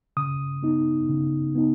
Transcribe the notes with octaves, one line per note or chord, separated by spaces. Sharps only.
C#3 D#6
B3 D#4
C#3
B3 D#4